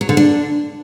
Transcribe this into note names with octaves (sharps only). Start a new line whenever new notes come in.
F#3
D3
D4